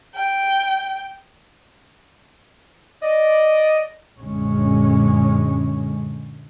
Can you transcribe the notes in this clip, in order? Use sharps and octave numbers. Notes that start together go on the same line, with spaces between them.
G5
D5 D#5
A#1 F#2 D3 G#3 C#4